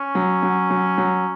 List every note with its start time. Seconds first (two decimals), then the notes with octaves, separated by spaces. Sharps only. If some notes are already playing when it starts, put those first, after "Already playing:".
Already playing: C#4
0.15 F#3
0.43 F#3
0.70 F#3
0.98 F#3